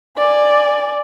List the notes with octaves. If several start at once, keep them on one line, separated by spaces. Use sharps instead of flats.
D5 G#5